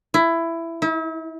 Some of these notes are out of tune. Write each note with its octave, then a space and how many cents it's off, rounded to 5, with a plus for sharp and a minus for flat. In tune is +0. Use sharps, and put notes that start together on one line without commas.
E4 +15
E4 -40